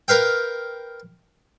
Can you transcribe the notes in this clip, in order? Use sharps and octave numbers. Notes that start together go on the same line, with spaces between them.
A#4 B4 F5 G5